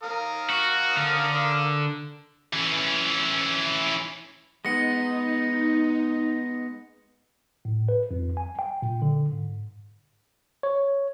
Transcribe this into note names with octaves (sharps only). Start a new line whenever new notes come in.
A#4 F5 D#6
F#4
D3
E3 C#4
G#3 B3 D#4 A#6 C#7
A2
B4
F2
G#5
G5
A#2
D3
G#2
C#5